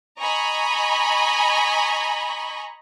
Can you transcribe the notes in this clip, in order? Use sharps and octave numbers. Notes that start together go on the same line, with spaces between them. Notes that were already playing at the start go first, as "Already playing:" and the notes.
D#5 G#5 A#5 B5 C#6